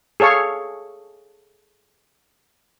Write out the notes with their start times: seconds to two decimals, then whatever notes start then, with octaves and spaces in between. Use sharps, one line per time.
0.20 G#4 A4 C#5 F5 C#6